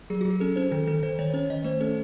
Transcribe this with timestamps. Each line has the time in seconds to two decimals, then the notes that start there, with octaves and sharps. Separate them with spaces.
0.10 F#3 G#4
0.21 F#3 F#4
0.30 G#4
0.40 C#4 A4
0.56 C#4 C5
0.71 D#3 A4
0.87 D#3 A4
1.03 D#3 C5
1.19 D#3 C#5
1.34 C#4 C#5
1.50 D#3 D#5
1.64 A3 C5
1.81 C#4 A4